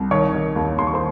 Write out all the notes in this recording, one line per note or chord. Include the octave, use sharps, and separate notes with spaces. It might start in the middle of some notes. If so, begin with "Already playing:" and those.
Already playing: C2
D#3 C#5 C#6
D#3
D#2
D#2 C6
C#6
C5 C6